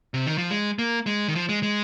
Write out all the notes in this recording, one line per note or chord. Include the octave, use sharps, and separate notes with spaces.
C3
D#3
F3
G#3
A#3
G#3
D#3
F3
G#3
G#3